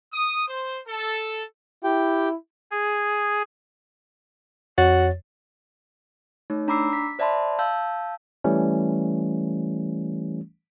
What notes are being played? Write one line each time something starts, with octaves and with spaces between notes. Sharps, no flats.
D#6
C5
A4
E4 G4 G5
G#4
F2 F#4 C#5 A6
A3 D#4 C#5
D4 A#5 B5 D6 E6 C7
B6
C5 D5 E5 A5 B5 C6
F5 A5 E6 G6
E3 G3 A3 C#4